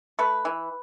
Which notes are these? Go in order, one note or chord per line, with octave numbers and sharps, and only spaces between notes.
A3 B4
E3